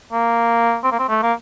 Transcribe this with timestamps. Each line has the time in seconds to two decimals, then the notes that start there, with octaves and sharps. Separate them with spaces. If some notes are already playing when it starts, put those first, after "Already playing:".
0.12 A#3
0.84 C4
0.92 A#3
0.99 C4
1.09 A3
1.23 A#3